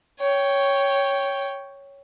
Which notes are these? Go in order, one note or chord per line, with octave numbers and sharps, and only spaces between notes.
C#5 G5